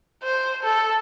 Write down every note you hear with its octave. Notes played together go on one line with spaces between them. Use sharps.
C5
A4